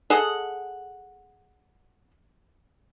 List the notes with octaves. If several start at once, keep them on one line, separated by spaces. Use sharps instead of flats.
G#4 A4 D#5 F#5